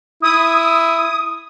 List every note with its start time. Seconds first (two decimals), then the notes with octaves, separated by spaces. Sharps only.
0.22 E4 D#6